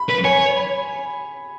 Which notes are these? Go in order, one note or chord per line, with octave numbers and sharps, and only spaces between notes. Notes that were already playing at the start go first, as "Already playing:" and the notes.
Already playing: B5
B4
C#5 G#5
B5